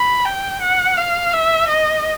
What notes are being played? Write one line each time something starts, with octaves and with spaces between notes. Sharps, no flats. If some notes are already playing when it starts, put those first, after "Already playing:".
Already playing: B5
G5
F#5
F5
E5
D#5